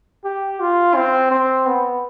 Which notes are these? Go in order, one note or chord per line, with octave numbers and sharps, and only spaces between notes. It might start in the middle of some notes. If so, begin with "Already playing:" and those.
G4
F4
C4
C4
B3